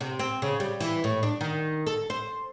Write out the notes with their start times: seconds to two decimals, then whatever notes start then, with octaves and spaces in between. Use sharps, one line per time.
0.01 C3
0.19 C4
0.42 C#3
0.60 G3
0.80 E3
1.04 A2
1.23 D4
1.41 D#3
1.87 A4
2.10 C5